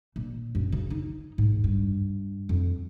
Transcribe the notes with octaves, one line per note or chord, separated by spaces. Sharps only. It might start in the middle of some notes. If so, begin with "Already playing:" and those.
A#2
F#2
C#3
D#4
G#2
G2
F2